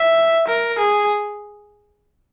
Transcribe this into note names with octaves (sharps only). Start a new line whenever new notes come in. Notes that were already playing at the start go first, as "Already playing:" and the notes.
Already playing: E5
A#4
G#4